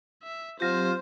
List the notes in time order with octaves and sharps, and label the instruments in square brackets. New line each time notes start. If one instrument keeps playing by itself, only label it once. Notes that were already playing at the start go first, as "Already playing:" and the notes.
[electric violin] E5
[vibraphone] F#3 C4 G4 [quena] F4 [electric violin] C5